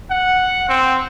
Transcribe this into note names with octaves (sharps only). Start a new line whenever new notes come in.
F#5
C4